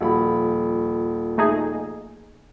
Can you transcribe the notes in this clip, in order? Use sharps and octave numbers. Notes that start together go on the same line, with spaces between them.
D#1 F3 F4 F#4 B5
A3 D#4 G#4